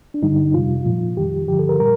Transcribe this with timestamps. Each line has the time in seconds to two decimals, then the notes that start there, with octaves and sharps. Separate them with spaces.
0.14 D4
0.22 G2 D3 G3 D#4
0.54 F2 C3 G3 F4
0.85 A#2 F3
1.16 F2 D#3 G3 G4
1.48 G2 D3 F3 G4
1.59 A4
1.69 A#4
1.79 A#2 G3 A#4